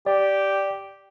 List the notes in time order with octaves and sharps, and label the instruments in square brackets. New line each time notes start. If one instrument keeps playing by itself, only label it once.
[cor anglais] G4 [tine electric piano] D5